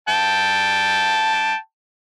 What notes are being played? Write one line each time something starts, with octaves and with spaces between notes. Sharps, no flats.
G5 A5